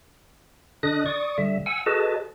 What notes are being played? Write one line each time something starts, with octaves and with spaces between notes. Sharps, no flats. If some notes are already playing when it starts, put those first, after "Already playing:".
D3 D4 D#5 D#6 F#6
D5 C#6 D#6
D3 G3 E5
F#5 G#5 E6
F#4 G#4 A4 B4 D#5 A5